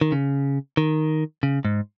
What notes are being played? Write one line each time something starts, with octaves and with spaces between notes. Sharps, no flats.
D#3
C#3
D#3
C#3
G#2